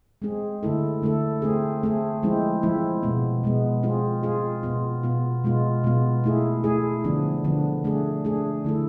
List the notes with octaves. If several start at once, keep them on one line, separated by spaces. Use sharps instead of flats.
G#3 C4 G#4
D3 A3 E4 A4
D3 A3 E4 A4
A3 C4 G#4
A3 C4 G#4
F3 G#3 C4 E4
F3 G#3 C4 E4
B2 G#3 B3
B2 G#3 B3
G#3 C4 F4 G#4
G#3 C4 F4 G#4
B2 B3 F4
B2 B3 F4
B2 G#3 B3 F4
B2 G#3 B3 F4
A3 E4 G#4
A3 E4 G#4
D3 F3 B3 D4
D3 F3 B3 D4
A3 D4 G#4
A3 D4 G#4
D3 A3 E4 A4